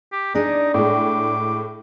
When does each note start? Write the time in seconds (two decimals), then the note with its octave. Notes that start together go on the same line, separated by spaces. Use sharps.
0.12 G4
0.35 D4 D#4 G#4 D5
0.74 A2 G#3 D6